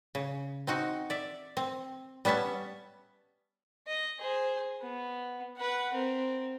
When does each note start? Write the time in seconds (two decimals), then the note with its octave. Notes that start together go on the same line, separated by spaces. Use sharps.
0.15 C#3
0.67 C4 D#4 F#4
1.10 D5 E5
1.57 C4
2.25 G3 B3 C#4 E5 A5
3.87 D#5
4.20 G#4 C5
4.82 B3
5.57 B4 F#5
5.93 C4 A#4